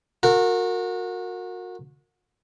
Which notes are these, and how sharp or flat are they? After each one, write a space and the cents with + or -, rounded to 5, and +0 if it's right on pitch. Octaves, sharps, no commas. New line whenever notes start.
F#4 -30 A#4 -25